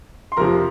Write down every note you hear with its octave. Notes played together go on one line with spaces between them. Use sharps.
C6
F2 C3 F3 A#4 A#5